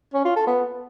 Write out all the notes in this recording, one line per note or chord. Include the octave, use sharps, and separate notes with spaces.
C#4
F4
A4
B3